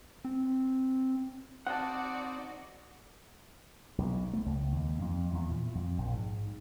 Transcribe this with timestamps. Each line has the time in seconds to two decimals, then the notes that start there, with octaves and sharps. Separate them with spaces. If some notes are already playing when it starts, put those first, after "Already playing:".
0.25 C4
1.67 C4 D#4 F#4 D5 F#5 A5
3.98 B1
4.33 A3
4.46 C#2
4.72 D#2
5.01 F2
5.33 E2
5.50 A#2
5.75 F2
5.98 A#1
6.14 G#2